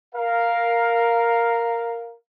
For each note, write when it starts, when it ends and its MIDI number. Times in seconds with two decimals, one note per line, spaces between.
0.15 2.15 70
0.15 2.15 77